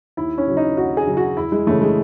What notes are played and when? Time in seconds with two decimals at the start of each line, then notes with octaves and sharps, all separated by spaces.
0.17 D#2 E4
0.38 C#4
0.47 C#3 F#3
0.57 D#4
0.77 D#2 F#4
0.97 G#4
1.07 C#3 F#3
1.17 F#4
1.37 E2 E4
1.52 G#3
1.67 C#3 E3 A3
1.81 G#3